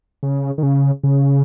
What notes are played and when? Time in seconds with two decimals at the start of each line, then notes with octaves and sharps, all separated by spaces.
0.23 C#3
0.58 D#3
0.63 C#3
1.04 C#3